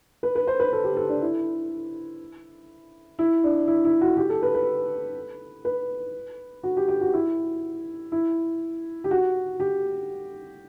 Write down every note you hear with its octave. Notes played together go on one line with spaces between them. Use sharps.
B4
B4
C5
B4
A4
G4
A4
D4
E4
E4
D4
E4
E4
F#4
G4
A4
B4
B4
B4
F#4
G4
G4
F#4
E4
E4
G4
F#4
G4